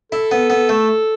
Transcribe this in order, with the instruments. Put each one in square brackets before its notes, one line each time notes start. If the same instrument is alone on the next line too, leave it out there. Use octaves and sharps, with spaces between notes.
[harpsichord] E4 [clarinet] A4
[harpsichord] B3
B3
A3